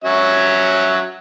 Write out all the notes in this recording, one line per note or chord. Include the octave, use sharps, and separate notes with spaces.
F#3 C#4 E5